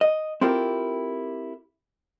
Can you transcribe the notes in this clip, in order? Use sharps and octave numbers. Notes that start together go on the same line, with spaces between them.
D#5
C4 E4 F4 G4 A4 A#4